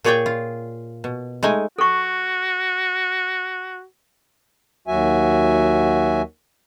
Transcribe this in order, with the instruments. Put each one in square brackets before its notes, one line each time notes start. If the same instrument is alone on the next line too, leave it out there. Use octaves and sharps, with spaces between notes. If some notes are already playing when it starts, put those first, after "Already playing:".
[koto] A#2 G#4 C#5 D5 G5 G#5
F4
B2
G#3 A3 D#4 G#5
[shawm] F#4 [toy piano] A4 C#6
[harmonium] D#2 F#3 F#4 E5 G#5